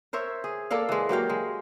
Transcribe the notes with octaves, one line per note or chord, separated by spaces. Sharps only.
A#4 C5 C#5 E5
G#4
A#3 A4 D5 F5
E3 G#3
F#3 A#3 G4 F5
G#3